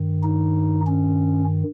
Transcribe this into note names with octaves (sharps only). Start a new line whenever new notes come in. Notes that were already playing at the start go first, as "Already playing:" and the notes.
Already playing: G2 D#3
D#4
C#4